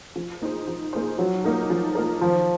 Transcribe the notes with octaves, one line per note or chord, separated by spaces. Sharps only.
F3
A#3 D#4 G#4 C5
F3
A#3 D#4 G#4 C5
F3 F#3
A#3 D#4 A#4
F3
A#3 D#4 A#4
D#3 F3